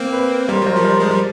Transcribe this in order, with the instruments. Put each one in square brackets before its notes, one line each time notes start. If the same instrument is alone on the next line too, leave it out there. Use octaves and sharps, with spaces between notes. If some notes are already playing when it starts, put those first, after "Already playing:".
Already playing: [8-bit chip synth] A#3 C4
[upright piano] B4
[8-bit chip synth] G3 [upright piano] A#4 C5
[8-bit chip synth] F#3 [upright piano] A#4 C5
[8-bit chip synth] F3 G3
[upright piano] A#4 C5
[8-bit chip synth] G#3 [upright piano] A#4 C5
[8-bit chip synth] G3